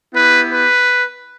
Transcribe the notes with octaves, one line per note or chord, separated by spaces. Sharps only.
B3 E4 G4 B4
B4